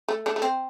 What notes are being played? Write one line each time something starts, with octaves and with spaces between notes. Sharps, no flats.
A3
A3 D4
A3
C4